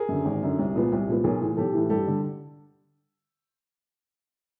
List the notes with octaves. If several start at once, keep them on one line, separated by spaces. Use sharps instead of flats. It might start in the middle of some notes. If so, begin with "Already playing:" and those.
Already playing: G#4 A#4
F#2 D3
G#1
F#2 D3
C2
A#2 F3 G#3 B3
C2
A#2 F3 G#3 B3
B1 G#4 A#4
A2 E3
B1 G4 A4
A2 E3
G2 G4 A4
D3 G3